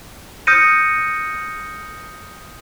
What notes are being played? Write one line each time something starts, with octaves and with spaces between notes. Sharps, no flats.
D#6 F6 G6 A#6 C#7 D#7